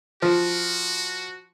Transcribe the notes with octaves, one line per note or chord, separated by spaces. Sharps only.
F3 F#4